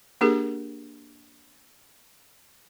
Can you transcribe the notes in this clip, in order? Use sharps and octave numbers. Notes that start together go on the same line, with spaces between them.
A#3 D4 G4 G#4 A#4